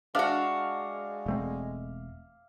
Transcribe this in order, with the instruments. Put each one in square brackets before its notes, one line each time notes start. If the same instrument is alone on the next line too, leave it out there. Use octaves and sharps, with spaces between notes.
[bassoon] G#3 [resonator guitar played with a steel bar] D4 F#4 [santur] E5 F5 D6
[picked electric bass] E1 A3 C4